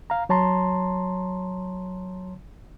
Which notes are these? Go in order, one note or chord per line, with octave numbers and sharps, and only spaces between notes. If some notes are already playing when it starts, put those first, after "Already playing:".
F5 A#5
F#3 C#5 A5 A#5 C6